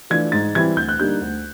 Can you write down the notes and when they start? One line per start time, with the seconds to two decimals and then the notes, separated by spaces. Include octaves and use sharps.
0.10 E3 A3 D4 F4 G#6
0.32 G#2 A6
0.55 E3 G3 C4 E4 G#6
0.77 D2 G6
0.89 F#6
0.99 D3 G3 A#3 D#4 G6
1.21 D2